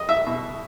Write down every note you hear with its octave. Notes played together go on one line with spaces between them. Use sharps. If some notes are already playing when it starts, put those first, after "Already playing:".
Already playing: D#5
E5
B2